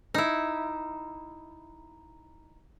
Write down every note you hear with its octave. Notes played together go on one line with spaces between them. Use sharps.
D#4 E4